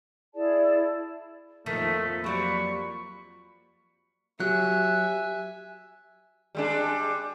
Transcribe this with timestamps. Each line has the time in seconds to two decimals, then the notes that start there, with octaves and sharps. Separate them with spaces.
0.34 E4 G#4 D5 A5
1.66 F2 D#3 F3 A3 A#3 B6
2.24 F#3 G4 D5 B5 C#6
4.40 F#3 G4 E5 G#5 F#6
6.55 G3 G#3 D4